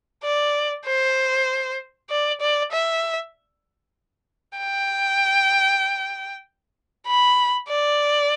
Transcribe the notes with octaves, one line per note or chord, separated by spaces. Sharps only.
D5
C5
D5
D5
E5
G5
B5
D5